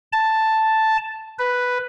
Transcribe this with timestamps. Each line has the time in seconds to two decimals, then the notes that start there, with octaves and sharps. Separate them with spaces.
0.13 A5
1.39 B4